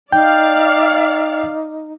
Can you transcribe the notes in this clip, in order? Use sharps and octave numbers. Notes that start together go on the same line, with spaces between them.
D#4 D5 F5 G5 G6